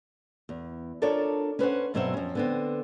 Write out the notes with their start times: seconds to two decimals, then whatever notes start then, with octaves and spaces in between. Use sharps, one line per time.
0.49 E2
1.02 D4 F4 A4 A#4 C#5 D5
1.59 C#4 B4 C5 F#5
1.94 G2 B2 F#3 C4 E5 F#5
2.14 F2 C#4
2.35 D3 B3 C4